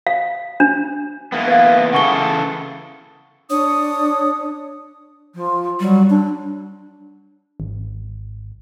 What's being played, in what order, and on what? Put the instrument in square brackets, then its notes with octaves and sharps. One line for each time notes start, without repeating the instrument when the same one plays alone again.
[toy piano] F5
D4
[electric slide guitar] E3 A#3 B3
[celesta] B4 F5
[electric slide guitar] C#3 E3 A4 [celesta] F#5 C#6 G7
[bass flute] D4 [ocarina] C#5 [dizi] D#6
[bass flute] F3
[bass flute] F#3 [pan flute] G3
[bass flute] D4
[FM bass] G#1